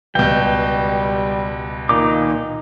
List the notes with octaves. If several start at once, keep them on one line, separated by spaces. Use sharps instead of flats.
C#2 B2 G3 G5
A#2 D#3 D#4 D6